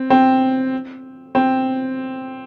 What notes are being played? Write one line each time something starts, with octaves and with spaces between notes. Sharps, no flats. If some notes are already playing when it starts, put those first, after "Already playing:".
Already playing: C4
C4
C4